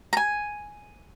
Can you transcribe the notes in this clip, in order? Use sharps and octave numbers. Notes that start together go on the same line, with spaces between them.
A#5
G#5